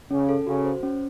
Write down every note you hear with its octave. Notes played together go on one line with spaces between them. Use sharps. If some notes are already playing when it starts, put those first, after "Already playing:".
C#3 C#4
A4
C#3 F#4
C5
C#4